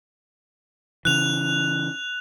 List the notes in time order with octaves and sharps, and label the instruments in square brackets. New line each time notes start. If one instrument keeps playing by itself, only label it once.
[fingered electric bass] C#3 E3 [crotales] F#6 F7